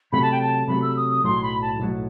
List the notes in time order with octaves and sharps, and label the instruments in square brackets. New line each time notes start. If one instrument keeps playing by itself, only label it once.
[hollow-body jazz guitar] C3 F#3 A3 [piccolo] B5
[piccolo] A5
G5
A5
[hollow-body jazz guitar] C3 F#3 A3 [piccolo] B5
[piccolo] E6
D#6
D#6
[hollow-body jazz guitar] B1 A2 F#3 [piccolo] C6
[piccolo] B5
A5
[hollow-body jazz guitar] B1 A2 F#3